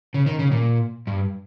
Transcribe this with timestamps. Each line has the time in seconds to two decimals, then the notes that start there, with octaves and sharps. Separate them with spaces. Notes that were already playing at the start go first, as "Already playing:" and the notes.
0.14 C#3
0.26 D#3
0.39 C#3
0.52 A#2
1.07 G2